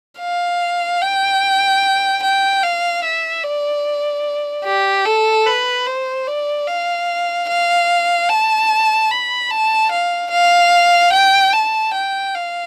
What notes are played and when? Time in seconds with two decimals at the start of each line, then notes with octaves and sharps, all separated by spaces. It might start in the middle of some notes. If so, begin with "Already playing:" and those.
0.20 F5
1.02 G5
2.23 G5
2.63 F5
3.04 E5
3.44 D5
4.65 G4
5.06 A4
5.46 B4
5.87 C5
6.27 D5
6.67 F5
7.49 F5
8.29 A5
9.11 B5
9.51 A5
9.92 F5
10.31 F5
11.13 G5
11.53 A5
11.94 G5
12.35 F5